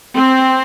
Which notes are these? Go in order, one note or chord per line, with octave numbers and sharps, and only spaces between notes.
C4